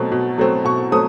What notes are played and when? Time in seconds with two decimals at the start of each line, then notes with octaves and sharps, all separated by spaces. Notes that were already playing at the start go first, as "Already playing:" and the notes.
Already playing: B2 F#3 A3 C4
0.12 B2
0.38 F#3 A3 C4
0.65 B2 C#6
0.92 F#3 A3 C4 D#6